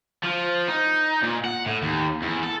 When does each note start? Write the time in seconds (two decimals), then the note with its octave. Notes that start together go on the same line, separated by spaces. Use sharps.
0.24 F3
0.68 D#4
1.22 A#2
1.45 F#5
1.66 A2
1.82 D#2
2.22 E2
2.44 A4